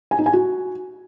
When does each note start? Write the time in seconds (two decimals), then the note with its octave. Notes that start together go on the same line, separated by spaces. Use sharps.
0.11 G#5
0.19 D#4
0.26 G#5
0.33 F#4